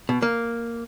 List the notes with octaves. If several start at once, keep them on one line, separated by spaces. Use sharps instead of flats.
B2
A#3